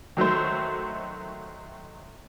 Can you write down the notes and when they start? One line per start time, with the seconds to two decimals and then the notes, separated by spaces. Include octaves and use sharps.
0.17 D#3 F#3 A3 C5